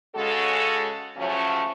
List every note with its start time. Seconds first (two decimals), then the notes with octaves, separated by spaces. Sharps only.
0.15 C#3 G#3 C#4 F#4 A4
1.16 C#3 F3 F#3 A3 C#4